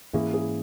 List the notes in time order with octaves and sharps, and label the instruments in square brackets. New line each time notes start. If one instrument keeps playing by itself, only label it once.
[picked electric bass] G#2 E3 A#3 C#4 [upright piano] E4 G#4
[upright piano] E4 G#4